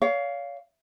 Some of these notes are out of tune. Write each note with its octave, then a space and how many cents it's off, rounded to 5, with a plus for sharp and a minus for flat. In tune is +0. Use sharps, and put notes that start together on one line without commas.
C#5 +35 F5 +0